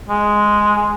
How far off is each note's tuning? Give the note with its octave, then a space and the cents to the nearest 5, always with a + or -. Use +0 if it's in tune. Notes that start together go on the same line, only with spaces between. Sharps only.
G#3 +0